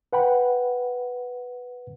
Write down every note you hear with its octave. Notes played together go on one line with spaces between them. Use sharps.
B4 F#5 G5 B5